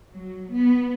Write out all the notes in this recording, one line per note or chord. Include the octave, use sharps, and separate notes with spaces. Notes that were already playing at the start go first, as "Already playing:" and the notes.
F#3
B3